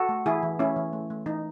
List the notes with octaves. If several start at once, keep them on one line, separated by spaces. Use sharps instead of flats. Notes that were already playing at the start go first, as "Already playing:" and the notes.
Already playing: F#4 A4
A3
E3 E4 G#4
E3
A3 C#4 E4
E3
A3
A3
E3 D#4